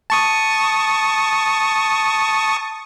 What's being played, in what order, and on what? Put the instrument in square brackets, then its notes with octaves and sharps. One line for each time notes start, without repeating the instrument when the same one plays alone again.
[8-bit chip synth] A5 C#6 D#6